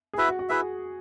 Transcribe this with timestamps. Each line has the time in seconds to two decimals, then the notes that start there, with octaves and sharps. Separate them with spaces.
0.13 G#4
0.17 E4 F#4 B4 E5
0.29 F#4
0.39 F#4
0.49 E4 G#4 B4 E5